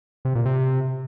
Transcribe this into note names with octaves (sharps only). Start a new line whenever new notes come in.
C3
A#2
C3